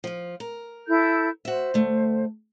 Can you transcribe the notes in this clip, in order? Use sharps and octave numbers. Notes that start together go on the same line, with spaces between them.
F3 F4
A#4
E4 A4 G6
F#4 C5 E5
D2 A3